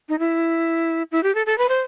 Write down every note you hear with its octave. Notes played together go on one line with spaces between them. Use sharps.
D#4
E4
E4
G4
A4
A4
B4
C5